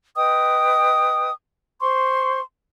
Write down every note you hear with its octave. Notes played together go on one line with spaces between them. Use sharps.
B4 D#5 G5 D#6
C5 C6 C#6